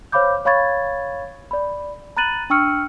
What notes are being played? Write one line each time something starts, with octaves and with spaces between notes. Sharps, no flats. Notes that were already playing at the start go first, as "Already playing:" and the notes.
C5 C#5 F5 B5 D6 G6
C#5 F5 B5 C#6 G#6 A6
D5 B5
A#5 B5 F#6 A6 D#7 F#7
D4 G5 C#6 E6 F6 C#7